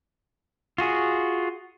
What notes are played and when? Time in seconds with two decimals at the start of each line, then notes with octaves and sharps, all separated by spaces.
0.78 F4 F#4 G#4